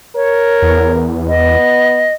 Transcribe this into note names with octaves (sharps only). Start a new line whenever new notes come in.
A#4 C#5
E2
B3 D#5